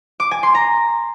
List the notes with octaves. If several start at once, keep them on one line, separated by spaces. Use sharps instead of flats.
D6
G#5
C6
A#5